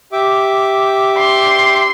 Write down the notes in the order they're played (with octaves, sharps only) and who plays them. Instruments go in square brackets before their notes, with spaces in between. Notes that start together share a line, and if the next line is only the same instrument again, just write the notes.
[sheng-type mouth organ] G4 E5 D6
[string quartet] C6